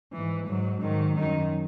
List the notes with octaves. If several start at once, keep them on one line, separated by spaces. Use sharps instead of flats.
G#2 E3
G#2 F#3
G#2 D#3 F#3
F#2 D#3 F#3 D#4